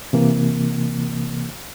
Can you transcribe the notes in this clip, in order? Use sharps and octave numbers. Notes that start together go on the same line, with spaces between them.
C3 E3 A#3